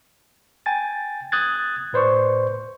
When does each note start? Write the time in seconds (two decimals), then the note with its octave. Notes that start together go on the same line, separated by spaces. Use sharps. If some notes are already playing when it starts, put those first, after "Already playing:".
0.66 G5 G#5 A6
1.32 D#6 F#6 G#6 A6
1.93 A2 B4 C5 D5 C#6